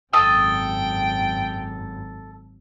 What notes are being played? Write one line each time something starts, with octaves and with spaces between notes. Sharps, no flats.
G#1 F#2 A4 G5 D#6